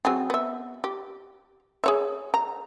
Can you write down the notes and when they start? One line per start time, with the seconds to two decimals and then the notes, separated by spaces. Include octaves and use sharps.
0.05 F#3 C4 G#4
0.30 B3 E5
0.84 G4
1.84 G#4 C#5 E5
2.34 A#5